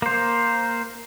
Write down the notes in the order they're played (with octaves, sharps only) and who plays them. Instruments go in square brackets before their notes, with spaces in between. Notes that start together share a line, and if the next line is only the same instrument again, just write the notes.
[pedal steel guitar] A#3 C5